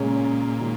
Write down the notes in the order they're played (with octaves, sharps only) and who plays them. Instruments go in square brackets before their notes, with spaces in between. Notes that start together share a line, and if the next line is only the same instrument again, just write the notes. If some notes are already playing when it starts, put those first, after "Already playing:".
Already playing: [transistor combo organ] A#2 [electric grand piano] C#3 G#3 C#4 G#4 C#5
[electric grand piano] D#3 G#3 F#4